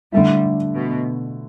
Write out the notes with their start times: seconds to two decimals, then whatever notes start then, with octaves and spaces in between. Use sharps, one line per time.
0.12 D3 G3 A3 E4
0.75 B2